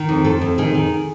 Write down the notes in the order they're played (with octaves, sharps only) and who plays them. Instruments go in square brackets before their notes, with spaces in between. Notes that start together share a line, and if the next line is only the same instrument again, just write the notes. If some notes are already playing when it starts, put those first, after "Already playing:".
Already playing: [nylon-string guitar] D#3
F2
F2 A4
F2
D#3 G#4
D#3